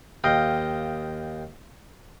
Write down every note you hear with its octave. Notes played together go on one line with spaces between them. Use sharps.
D#2 D#5 F5 G5